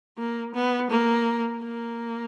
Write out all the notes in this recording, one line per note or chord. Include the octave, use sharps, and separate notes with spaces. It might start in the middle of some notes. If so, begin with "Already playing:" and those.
A#3
B3
A#3
A#3